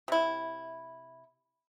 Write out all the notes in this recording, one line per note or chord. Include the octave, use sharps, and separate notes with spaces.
C3 E4